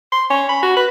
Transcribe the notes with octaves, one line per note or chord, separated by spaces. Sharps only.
C6
C#4
B5
F#4
B4